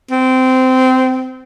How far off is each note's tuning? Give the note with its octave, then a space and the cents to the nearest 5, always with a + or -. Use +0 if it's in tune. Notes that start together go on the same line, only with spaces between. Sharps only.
C4 -20